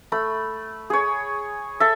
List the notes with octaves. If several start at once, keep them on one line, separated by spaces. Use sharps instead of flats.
A3 B5
G#4 C#5
A4 E5